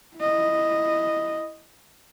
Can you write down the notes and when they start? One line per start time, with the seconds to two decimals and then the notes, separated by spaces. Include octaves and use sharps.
0.16 E4 D#5